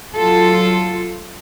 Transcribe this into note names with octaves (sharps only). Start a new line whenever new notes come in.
F#3 F4 A4